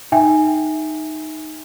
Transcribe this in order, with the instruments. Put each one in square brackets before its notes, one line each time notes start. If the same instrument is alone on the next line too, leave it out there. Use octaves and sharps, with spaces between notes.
[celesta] D#4 E5 G5 G#5